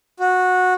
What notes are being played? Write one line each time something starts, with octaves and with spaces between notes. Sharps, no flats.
F#4